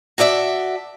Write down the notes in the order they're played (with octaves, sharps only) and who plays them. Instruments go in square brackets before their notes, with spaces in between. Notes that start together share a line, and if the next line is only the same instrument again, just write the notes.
[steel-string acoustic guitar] F#4 A4 D5 E5